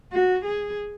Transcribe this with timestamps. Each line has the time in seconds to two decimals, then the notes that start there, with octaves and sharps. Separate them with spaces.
0.13 F#4
0.45 G#4